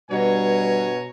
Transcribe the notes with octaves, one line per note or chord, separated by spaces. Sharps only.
G2 B2 C#5 G#5 A#5